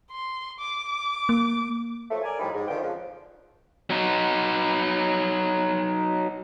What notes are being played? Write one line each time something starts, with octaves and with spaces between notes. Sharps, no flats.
C6
D6
A#3
F3 F#3 A3
A#4 D5 G#5
A2 F3 G3 D#4 B5
G#2
D3 D#3 F3 B3 G5
F2 C#3 F3
F#3 D#4